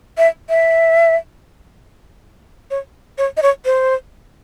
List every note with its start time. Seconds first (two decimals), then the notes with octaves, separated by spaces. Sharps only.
0.18 E5
0.49 E5
2.71 C#5
3.18 C#5
3.37 D#5
3.42 C#5
3.65 C5